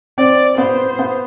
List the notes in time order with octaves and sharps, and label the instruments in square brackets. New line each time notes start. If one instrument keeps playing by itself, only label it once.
[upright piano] C4 [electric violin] D5
[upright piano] B3 [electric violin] C5
[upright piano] B3